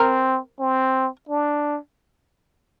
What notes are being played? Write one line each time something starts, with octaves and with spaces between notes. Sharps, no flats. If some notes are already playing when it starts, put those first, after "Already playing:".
Already playing: C4 A#4
C4
D4